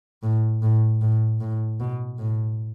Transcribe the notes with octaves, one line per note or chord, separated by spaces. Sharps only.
A2
A2
A2
A2
B2
A2